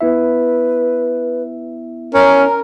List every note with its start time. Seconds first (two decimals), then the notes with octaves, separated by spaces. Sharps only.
0.01 B3 E4 B4 E5
2.14 C#4 A#4 A#5